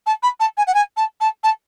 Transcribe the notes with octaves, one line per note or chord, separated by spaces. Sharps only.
A5
B5
A5
G#5
F#5
G#5
A5
A5
A5